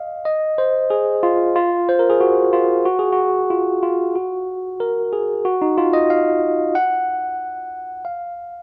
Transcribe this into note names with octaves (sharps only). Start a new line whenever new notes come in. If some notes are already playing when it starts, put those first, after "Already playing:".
Already playing: D#5 F5
D#5
C5
G#4
F4
F4
C5
A#4
G#4
F#4
F4
F#4
G#4
F#4
F4
F4
F#4
A#4
G#4
F#4
D#4
F4
D#5
F5
F#5
F5